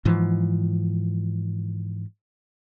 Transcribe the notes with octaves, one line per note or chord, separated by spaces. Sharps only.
G#2 E3 F3